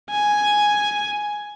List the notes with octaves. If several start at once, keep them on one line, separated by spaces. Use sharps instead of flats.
G#5